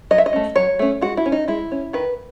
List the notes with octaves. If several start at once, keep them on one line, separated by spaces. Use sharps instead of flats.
F#3 D#5
E5
D#5
A3 C#4
F#3 C#5
A3 C#4
G#3 F#4
E4
C#4
D#4
G#3 E4
C#4
D#3 B4